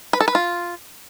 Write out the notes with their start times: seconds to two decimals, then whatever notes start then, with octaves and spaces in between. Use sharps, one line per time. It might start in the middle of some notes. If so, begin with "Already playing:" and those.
0.13 B4
0.20 A4
0.28 B4
0.35 F4